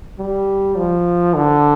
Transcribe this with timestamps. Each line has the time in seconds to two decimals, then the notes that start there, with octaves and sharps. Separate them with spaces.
0.19 G3
0.77 F3
1.35 D3